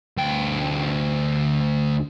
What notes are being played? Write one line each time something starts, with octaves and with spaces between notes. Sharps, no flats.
D2 G5